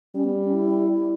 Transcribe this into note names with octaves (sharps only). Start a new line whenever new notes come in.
G3 C#4
B3
C#4
E4